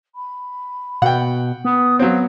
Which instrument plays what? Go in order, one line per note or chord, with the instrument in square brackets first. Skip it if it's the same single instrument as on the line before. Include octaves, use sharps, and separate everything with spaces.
[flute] B5
[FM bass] B2 [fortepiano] F#5 G5
[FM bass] B3 [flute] D#6
[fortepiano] F#3 C4 [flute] F5